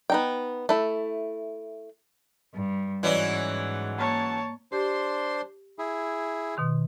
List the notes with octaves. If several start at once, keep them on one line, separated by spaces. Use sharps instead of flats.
B3 D#4 G5
A3 E4
G2
G#2 E3 F#3 C#4 D5 D#5
A#3 C#5 A5
D4 G4 C5 C6
E4 G#4
B2 D#3 C6